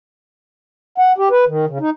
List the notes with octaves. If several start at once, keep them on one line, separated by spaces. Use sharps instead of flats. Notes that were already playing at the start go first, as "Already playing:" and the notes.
F#5
G4
B4
D#3
C#3
D#4